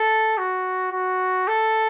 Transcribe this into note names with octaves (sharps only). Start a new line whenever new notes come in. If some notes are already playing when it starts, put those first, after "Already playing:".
Already playing: A4
F#4
F#4
A4